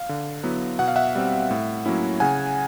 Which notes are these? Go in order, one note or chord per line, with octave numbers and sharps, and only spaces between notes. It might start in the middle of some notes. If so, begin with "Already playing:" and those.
Already playing: F5
D3
F#3 B3 E4
B2 F#5
F5
E5 F#5
G3 C4
A2
F#3 A#3 C#4 E4
C#3 F#5 G#5